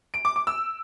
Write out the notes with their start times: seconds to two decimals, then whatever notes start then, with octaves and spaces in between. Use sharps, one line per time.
0.14 D7
0.25 D6
0.36 D6
0.47 E6